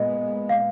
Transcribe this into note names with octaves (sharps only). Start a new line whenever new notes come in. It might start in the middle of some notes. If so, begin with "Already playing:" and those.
Already playing: A#2 G#3 B3 D#5
F5